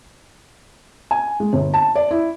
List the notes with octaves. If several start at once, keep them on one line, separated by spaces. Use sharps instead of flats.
G#5
G#3
G1
A5
D5
E4